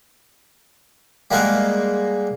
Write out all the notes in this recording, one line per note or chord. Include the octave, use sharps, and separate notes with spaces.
G3 G#3 A#3 A#4 F#5